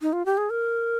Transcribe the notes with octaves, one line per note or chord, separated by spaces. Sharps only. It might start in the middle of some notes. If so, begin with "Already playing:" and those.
D#4
F4
G4
G#4
A#4